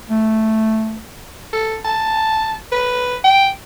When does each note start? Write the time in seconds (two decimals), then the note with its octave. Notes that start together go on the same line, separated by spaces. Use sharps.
0.10 A3
1.53 A4
1.85 A5
2.72 B4
3.24 G5